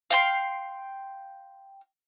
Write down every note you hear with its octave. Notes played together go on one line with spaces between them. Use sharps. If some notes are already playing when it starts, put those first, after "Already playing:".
F5 G5 C6